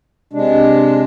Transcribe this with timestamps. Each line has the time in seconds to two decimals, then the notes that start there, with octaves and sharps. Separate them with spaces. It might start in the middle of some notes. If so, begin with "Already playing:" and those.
0.33 C3 G#3 D4